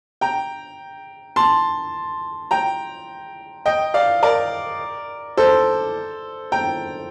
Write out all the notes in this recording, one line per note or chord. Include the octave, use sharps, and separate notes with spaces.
G5 A#5
A5 C6
G5 A#5
D#5 G5
D5 F5
A#4 D5
A4 C5
G5 A#5